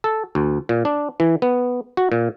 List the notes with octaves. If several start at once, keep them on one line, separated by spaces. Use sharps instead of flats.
A4
D2
A#2
D4
E3
B3
F#4
A#2